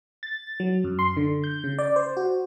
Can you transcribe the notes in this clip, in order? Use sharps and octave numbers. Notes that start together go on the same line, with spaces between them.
A6
F#3
F#2
C6
D3
G6
C#3
D5
C5
F#4